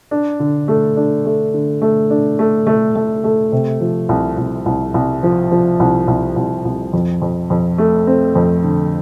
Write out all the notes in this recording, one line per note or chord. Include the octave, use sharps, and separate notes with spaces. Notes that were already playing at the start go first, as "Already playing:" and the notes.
D4
D3
A3
D4
A3
D3
A3
D4
A3
A3
A3
A3
C3
F3
C2
C2
C2
C2
F3
F3
C2
C2
C2
C2
F2
F2
F2
A3
C4
F2
D3